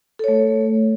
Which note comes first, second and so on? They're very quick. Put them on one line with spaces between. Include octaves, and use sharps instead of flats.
A4 C#5 A3